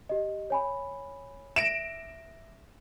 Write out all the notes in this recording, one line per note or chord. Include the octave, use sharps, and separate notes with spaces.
G4 D#5
C#5 G#5 B5
E5 A#6 D7 E7